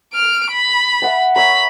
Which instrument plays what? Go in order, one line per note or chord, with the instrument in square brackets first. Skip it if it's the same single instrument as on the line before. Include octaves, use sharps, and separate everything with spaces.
[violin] F6 D7
B5
[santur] E5 F#5 A5
[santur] A#4 C#5 E5 [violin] B5